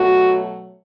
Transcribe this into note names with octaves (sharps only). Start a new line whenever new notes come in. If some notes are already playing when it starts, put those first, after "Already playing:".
Already playing: B2 F#3 A3 F#4